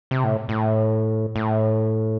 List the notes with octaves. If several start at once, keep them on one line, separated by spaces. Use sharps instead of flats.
C3
A2
A2
A2